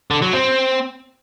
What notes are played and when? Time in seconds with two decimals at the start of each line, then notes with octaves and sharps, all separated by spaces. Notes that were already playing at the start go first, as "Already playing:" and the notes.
0.11 D3
0.22 F#3
0.33 C4